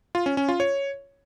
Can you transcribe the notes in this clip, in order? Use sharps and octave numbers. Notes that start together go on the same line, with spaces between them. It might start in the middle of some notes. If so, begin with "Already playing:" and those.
F4
C#4
C#4
F4
C#5